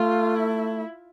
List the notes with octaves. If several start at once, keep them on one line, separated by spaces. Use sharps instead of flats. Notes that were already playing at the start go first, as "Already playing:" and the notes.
Already playing: A3 F4
E4